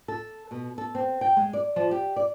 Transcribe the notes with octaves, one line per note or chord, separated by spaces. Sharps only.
A4
B2
A4
C4
G5
G#3
D5
F3
G4
D5